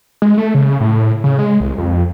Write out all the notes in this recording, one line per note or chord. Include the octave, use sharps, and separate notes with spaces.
G#3
A3
C#3
A2
C#3
G#3
C2
F2